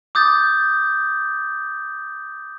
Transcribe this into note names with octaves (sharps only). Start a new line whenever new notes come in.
D6 D#6 G6 A6